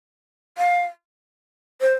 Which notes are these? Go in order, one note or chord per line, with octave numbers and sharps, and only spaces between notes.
F5
C5